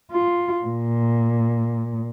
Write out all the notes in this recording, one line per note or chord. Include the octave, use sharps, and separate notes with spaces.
F4
A#2